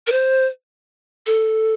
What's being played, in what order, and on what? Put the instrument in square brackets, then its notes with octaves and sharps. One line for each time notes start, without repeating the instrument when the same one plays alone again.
[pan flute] A#4
C5
A4